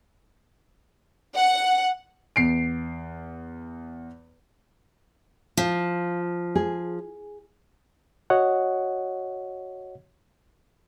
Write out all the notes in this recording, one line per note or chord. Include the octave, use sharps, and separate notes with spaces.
F#5
E2 C7 D7
F3 F4
G#4
F#4 C#5 D#5 F#5